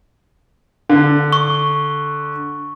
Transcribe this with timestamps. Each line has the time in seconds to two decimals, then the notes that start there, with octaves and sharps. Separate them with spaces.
0.89 D3
1.33 C#6